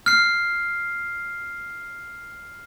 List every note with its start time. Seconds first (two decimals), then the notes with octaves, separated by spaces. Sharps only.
0.06 F6 C7